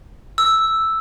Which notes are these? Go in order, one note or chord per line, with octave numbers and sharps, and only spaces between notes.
E6